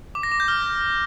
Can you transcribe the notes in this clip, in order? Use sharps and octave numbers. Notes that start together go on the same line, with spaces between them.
D6
A#6
D6
G6
F6